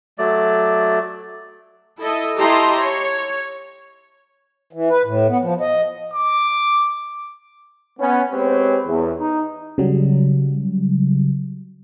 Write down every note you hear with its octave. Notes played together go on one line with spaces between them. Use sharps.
F#3 A3 D5
E4 A4 D#5
E4 G4 D#5 A5 A#5 C6
C#5
E3
B4
A2
B3
F3
D#5
D6
B3 C#4
G#3 C4 G4 B4 C#5
E2
D#4
C#3 F#3 G3